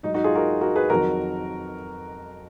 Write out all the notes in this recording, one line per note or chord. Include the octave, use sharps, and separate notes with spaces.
G#2 F#3 D#4
D#4 F#4
F4 G#4
F#4 A#4
F#4 A#4
G#4 B4
F2 D#3 F#3 F#4 A#4